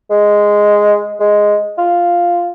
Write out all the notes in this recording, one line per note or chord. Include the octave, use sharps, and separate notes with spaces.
G#3
G#3
F4